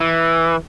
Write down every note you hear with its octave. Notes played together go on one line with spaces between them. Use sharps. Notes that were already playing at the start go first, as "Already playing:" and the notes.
E3